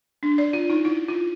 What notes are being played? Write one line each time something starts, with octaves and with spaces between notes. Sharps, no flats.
D4
D5
F4
D#4
E4
F4